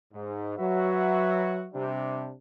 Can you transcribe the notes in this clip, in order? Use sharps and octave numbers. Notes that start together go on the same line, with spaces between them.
G#2
F#3 F#4 B4 E5
C3 G3 D4